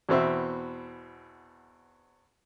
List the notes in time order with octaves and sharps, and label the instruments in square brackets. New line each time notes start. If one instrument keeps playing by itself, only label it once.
[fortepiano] E2 B2 C4 E5